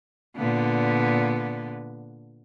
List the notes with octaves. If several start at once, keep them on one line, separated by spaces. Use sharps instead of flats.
A#2 D3 B3